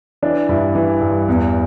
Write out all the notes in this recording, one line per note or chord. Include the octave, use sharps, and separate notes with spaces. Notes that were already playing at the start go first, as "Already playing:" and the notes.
E3 D4
G2 E4
E3
G2
E2